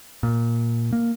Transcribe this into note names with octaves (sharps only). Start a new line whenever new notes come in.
A#2
A#3